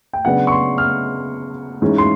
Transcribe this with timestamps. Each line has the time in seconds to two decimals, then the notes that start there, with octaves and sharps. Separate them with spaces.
0.13 G5
0.25 C#3 F#3 B3 D4 F#5
0.47 C#6
0.52 C6
0.78 F6
1.82 G#2 E3 G#3 C#4
1.98 C6